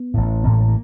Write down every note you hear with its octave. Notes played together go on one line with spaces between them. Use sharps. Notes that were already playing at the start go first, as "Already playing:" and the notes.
Already playing: B3
A1 A2
A1 A2 B3
A#3
A3
A#3